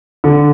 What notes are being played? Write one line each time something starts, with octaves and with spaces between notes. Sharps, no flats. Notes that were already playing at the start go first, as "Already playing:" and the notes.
D3